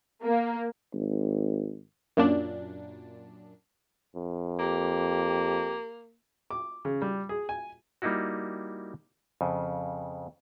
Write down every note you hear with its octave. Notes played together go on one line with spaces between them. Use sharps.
A#3
G#1
F#2 A#2 D4
F2
A#3 G4
D6
C#3
G3
G#4
G#5
G3 A#3 D#4 E4 F#4
F2 C#3